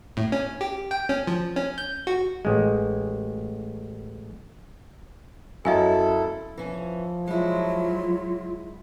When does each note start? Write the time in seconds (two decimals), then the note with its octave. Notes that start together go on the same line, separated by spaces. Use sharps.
0.17 A2
0.32 C#4
0.61 G4
0.91 G5
1.09 C#4
1.27 F3
1.56 C#4
1.78 G6
2.07 F#4
2.45 A1 G#3
5.65 F#2 E4 A4 D#5 F5 G#5
6.57 E3 F3 C#4
7.28 F#3 G#3 E4 F4